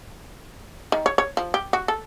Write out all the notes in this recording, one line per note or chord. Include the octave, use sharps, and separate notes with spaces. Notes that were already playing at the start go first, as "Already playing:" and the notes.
D#3
C#5
C#5
F3
G4
F#4
A4